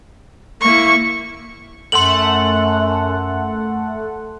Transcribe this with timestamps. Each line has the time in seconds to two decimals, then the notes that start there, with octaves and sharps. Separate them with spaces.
0.62 A#3 E4 C#6
1.92 F#2 A3 A4 F#5 C6 F#7